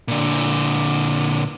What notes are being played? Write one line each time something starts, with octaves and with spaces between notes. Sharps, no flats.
A#2 D3